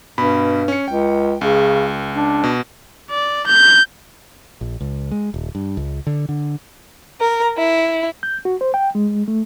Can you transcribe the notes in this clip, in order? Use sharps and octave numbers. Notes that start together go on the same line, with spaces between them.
G2 B2 B5
C#4 C#7
C#2 G5
C#2 C#3
D4
B2
D5
G6
A#1
C#2
G#3
D#1
G2
C#2
D3
D3
A#4
E4
G6
F#4
C5
G5
G#3
A3